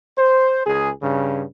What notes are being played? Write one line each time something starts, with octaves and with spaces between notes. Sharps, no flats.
C5
C#2 G#4
G2 C#3